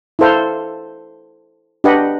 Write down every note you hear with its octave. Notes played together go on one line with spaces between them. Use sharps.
E4 A4 C5 F5
D4 G4 B4 D#5 F#5